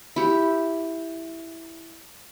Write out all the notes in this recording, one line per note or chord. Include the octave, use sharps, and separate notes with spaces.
E4 G4